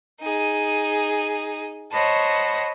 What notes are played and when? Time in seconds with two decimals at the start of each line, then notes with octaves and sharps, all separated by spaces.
0.21 D#4 G#4
1.91 C5 C#5 D#5 F#5 A5 B5